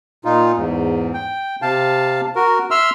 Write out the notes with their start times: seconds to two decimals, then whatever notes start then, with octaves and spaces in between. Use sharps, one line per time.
0.25 A#2 D#4 F4
0.57 E2 G#2
1.14 G5
1.62 C3 F5 A5
2.36 F#4 A#4
2.71 E5 C6 E6 F6